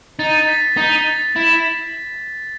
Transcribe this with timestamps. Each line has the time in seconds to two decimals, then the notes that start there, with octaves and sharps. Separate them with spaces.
0.19 D#4 A6
0.34 A6
0.44 A6
0.48 B6
0.77 D#4 B6
1.07 A6
1.36 E4